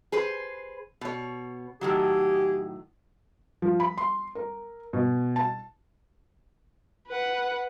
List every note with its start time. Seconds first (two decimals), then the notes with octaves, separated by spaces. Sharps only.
0.12 G#4 B4 C5
1.01 B2 C#5
1.81 A2 D#3 F#3 G4 G#4
3.62 F3
3.80 B5
3.98 C6
4.35 A#4
4.93 B2
5.36 A5
7.08 B4 F#5